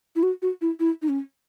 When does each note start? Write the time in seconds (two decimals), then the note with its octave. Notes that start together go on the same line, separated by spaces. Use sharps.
0.16 E4
0.23 F#4
0.42 F#4
0.61 E4
0.80 E4
1.02 D#4
1.09 C#4